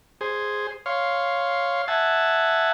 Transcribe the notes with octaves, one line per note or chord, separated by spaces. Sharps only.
G#4 C5
C#5 F5 C6
E5 F#5 G#5 A5